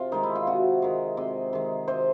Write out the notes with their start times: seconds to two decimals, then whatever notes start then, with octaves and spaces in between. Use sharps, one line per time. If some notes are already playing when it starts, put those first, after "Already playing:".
Already playing: C3 F4
0.12 D#3 G#3 D#4
0.23 E4
0.35 F4
0.47 C3 F#4
0.82 D#3 G#3
1.17 C3
1.53 D#3 G#3
1.88 C3 C5